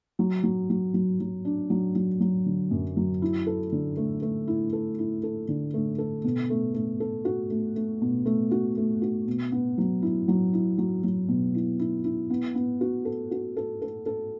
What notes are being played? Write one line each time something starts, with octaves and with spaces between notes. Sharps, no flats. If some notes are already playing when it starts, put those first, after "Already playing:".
F#3
F#3
F#3
F#3
F#3
D4
F#3
F#3
F#3
D3
F#2
F#3
E4
A4
D3
A3
A3
E4
A4
E4
A4
D3
A3
A4
B2
A3
A3
A4
F#4
A3
A3
B2
A3
F#4
A3
F#4
B2
B3
F#3
E4
F#3
E4
F#3
F#3
B2
E4
E4
E4
B3
B3
F#4
A4
F#4
A4
A4
A4